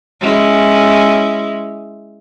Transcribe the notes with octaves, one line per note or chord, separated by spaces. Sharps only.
G#3 C#4 E4